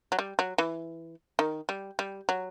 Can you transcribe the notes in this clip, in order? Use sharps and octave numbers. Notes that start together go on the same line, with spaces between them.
F#3
G3
F#3
E3
D#3
G3
G3
F#3